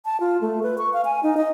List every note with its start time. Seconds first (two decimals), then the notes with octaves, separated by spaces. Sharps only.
0.05 A5
0.20 F4
0.41 A3
0.63 B4
0.78 C#6
0.93 F5
1.05 G#5
1.23 D#4
1.37 D#5